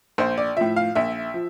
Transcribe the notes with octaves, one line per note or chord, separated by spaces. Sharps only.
A#1 C5
D5
A2 F3 E5
F5
A#1 E5
F3